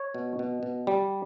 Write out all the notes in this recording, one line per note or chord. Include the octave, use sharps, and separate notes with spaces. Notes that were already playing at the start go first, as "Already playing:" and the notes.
Already playing: C#5
B2
B2
B2
G3